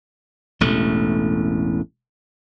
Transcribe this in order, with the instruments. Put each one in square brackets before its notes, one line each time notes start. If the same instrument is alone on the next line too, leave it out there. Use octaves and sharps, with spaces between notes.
[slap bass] E1 A1 A3